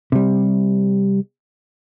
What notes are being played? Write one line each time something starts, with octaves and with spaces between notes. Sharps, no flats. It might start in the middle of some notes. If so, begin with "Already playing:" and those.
C3 G3